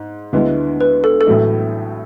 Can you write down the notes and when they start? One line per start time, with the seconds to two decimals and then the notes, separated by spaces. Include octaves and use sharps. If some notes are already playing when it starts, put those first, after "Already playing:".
Already playing: G#2
0.33 D2 D3 G#3 B3 E4
0.81 B4
1.04 A4
1.21 A4
1.27 A1 A2 F#3 A3 E4